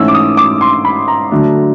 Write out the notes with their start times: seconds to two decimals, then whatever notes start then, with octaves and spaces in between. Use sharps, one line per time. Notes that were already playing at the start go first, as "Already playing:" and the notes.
Already playing: G#2 E3 A3 C#4 E6
0.08 D6
0.14 D#6
0.37 D6
0.61 C6
0.85 B5
1.08 A#5
1.31 D3 F#3 A3 D4